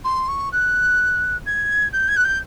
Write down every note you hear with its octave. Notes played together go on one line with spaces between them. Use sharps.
C6
C#6
F#6
G#6
G6
G#6
F#6
G6